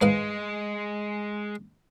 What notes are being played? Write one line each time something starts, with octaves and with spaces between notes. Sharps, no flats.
G#2 G#3 B4 F5